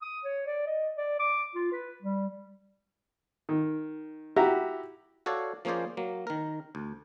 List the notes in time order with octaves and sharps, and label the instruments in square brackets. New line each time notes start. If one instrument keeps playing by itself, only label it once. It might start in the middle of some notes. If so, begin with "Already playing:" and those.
[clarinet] D#6
C#5
D5
D#5
D5
D6
F4
B4
G3
[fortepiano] D#3
E4 F#4 G4 A#5
[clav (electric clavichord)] F#4 A4 C#5 D5 F5
F3 A#3 C#4 G#4 C5 D5
F#3 A#3
D#3 A#4
D2